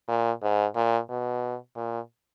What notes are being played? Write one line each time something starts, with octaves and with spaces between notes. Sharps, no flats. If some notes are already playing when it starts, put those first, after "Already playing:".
A#2
G#2
A#2
B2
A#2